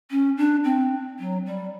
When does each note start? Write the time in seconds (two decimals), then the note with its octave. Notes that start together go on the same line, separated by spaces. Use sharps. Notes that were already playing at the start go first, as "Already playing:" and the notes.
0.10 C#4
0.37 D4
0.64 C4
1.19 F#3
1.46 G3